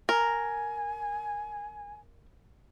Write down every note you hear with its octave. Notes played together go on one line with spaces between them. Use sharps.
A#4 G#5